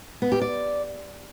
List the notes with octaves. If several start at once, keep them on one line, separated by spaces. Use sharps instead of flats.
B3
G4
D5